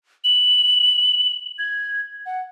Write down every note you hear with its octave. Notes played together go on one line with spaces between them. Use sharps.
F#7
G#6
F#5